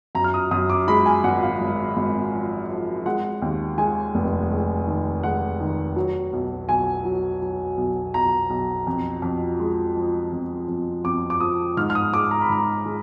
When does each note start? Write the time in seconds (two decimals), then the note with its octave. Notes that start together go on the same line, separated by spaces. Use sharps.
0.15 F#2 A#5
0.24 F6
0.34 D#6
0.51 F#2 D#6
0.70 D6
0.88 G#3 B5
1.06 G#5
1.24 G#1 F#5
1.43 F5
1.61 G#1
1.97 G#1
2.33 F3
2.69 F3
3.06 G#3 F#5
3.42 D#2
3.78 G#3 G#5
4.15 F1
4.51 G#3
4.87 D#3
5.23 G#3 F#5
5.60 D#3
5.96 F#3
6.33 B1
6.69 B1 G#5
7.05 F#3
7.42 F#3
7.77 B1
8.14 B1 A#5
8.50 B1
8.87 F2
9.22 F2
9.60 G#3
9.96 F3
10.32 F2
10.68 F2
11.04 F2 D6
11.30 D6
11.40 F3 D#6
11.77 G#2 F6
11.90 F6
11.95 D#6
12.14 G#3 D6
12.31 A#5
12.42 B5
12.49 G#2 A#5
12.86 G#3